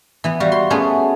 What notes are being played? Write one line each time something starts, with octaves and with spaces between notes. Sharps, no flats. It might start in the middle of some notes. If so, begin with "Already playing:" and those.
E3 B3
G3 F#4 F5
C6
A3 B3 C#4 G#4